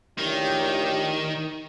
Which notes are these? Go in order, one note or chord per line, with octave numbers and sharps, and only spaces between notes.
A#1 A2 D#3 G4